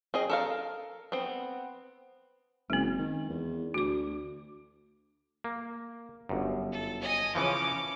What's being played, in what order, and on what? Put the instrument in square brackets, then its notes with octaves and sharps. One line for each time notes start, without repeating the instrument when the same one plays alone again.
[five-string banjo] C4 G#4 D#5
A4 A#4 F5
B3 C4
[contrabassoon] F#1 [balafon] G#3 C4
[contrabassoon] D#3
E2
[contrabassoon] D2 [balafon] F#4 D6
[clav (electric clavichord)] A#3
G1 F#2
[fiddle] A4
D#5 G#5
[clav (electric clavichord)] C#3 E3 F3 [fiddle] C#4 D6